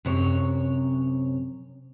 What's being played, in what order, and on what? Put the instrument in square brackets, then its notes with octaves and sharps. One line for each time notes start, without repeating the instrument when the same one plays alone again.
[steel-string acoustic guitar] F#2 C3 C#5